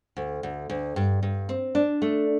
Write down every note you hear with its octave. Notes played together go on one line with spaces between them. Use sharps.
D2
D2
D2
G2
G2
C4
D4
A3